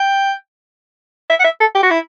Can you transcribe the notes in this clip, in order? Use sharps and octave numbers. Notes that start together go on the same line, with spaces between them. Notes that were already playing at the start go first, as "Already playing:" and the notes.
Already playing: G5
E5
F#5
E5
A4
G4
F#4
E4